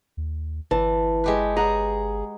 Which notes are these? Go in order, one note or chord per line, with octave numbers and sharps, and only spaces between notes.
D#2
G1 E3 A5
G#3 G4 B4
G#4 F#5 A#5